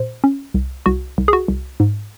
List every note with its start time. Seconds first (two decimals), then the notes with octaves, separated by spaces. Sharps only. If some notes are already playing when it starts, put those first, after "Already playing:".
Already playing: A#2 C5
0.24 C#4
0.54 C2
0.86 C2 F#4
1.18 C2
1.28 G#4
1.33 F#4
1.48 C2
1.80 G#2